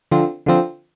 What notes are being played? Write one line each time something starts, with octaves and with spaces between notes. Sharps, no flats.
D3 F3 C4
D3 F3 C4